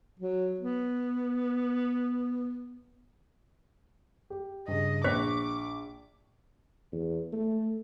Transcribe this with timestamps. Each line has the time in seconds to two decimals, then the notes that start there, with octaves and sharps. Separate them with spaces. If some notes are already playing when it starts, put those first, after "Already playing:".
0.20 F#3
0.60 B3
4.30 G4
4.68 G2 C#3 D#5
5.04 A#1 C5 C#6 D6 B6
6.92 E2
7.32 A3